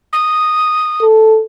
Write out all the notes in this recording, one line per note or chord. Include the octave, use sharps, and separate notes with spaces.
D#6
A4